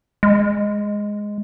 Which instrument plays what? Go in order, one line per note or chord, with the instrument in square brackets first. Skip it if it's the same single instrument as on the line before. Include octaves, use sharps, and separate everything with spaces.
[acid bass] G#3